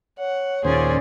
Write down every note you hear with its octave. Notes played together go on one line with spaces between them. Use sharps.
C#5 F#5
D#2 A#2 C#4 G#4 C5 D5